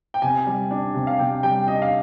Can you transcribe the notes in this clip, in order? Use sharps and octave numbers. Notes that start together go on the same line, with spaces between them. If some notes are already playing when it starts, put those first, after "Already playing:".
G5
C3 G#5
G3
D4
C3
F5
C3 G5
G3 G5
D4 D#5
F5